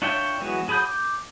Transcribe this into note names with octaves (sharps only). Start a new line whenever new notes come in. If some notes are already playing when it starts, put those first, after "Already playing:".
D4 F4 C#5 E5 G5
E3 F#3 G#3 B3 F#4
F#3 G#4 B5 D#6 G6
D6 G6